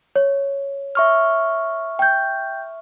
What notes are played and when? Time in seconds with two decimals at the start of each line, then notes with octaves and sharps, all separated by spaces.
0.16 C#5
0.95 E5 C#6 F6
1.99 G5 G6